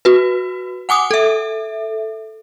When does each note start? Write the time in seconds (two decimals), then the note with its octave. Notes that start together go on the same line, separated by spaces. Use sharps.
0.05 F#4 B4
0.89 F#5 G#5 D6 D#6
1.11 A4 E5